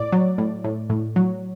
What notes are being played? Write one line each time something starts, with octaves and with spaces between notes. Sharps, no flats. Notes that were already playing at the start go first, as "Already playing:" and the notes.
Already playing: A2 D5
F#3
A2
A2
A2
F#3